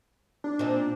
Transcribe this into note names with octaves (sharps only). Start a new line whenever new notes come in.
D4
A#2 C4 D#4